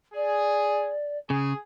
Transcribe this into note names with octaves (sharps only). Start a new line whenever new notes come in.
G#4 D5
C#3 G#4